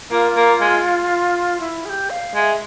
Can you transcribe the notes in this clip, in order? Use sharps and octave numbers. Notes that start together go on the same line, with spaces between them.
A#3 F4
A#3
G#3
E4
G#4
G4
F5
G#3 E5 F5